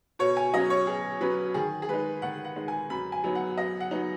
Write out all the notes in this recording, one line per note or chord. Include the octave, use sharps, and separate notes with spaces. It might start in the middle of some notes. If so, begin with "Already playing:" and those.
B2 C#5
G#5
F#3 C#4 D#5
C#5
B2 G#4
F#3 C#4 B4
D#3 G#4
G#4
G#3 D#4 B4
D#3 F#5
F#5
G#3 D#4
G#5
F#2 B5
G#5
F#3 B3 D#4
F#5
F#2 D#5
F#5
F#3 B3 D#4